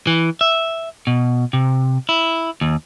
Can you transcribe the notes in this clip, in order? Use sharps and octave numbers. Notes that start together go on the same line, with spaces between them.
E3
E5
B2
C3
E4
D#2